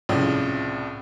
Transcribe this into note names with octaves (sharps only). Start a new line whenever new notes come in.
C2 A2 C#3 F3